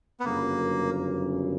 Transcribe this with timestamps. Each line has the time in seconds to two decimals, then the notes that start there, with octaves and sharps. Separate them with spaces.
0.20 B3
0.25 G1 F#2 C#3 F#3 A#3